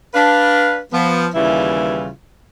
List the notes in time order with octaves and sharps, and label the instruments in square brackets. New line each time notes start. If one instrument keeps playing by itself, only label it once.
[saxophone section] D4 B4 F5
F3 B3
D#2 C#3 E3 G3 E4 F4